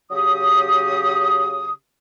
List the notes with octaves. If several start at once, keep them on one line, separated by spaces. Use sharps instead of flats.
C#3 F#3 G4 D#6